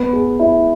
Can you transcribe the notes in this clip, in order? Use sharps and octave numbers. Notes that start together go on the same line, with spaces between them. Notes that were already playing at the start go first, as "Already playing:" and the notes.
Already playing: B3
G#4
E4